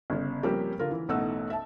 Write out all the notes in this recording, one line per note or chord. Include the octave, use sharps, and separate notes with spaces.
G1 C#3
F3 G3 A#3 C4 C#4 G4
D3 F4 A#4
E3
A1 B2 A3 D#4 F#5 E6
E5 A5